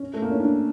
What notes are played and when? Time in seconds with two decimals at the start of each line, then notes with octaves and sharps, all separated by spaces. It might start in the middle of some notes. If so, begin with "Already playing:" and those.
Already playing: C#4
0.14 A3
0.22 A#3
0.31 C#4
0.40 D4